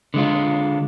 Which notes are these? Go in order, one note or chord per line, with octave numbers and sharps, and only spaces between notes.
D3 G#3 F4